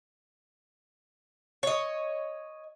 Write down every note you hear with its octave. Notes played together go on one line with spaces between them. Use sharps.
C#5 D#5